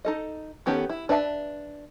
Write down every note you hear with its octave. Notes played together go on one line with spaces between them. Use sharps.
D#4 A4 D#5
D#3 B3 C#4 G4 A4
E4
D4 B4 E5 A5